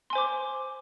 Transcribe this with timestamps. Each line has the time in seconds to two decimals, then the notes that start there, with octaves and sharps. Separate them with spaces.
0.10 C6
0.13 G#5
0.15 C5
0.18 D6